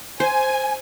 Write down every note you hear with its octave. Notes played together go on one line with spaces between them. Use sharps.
C5 G#5